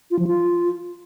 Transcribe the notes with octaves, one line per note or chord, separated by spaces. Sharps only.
F4
F3
F4